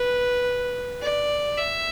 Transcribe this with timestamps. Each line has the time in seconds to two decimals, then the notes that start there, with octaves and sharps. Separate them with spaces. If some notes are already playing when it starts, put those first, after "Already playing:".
Already playing: B4
1.02 D5
1.57 E5